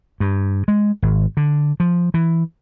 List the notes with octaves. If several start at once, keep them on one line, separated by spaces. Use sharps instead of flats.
G2
G#3
G#1
D3
F3
E3